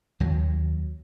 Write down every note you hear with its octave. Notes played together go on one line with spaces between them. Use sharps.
D#2 F#3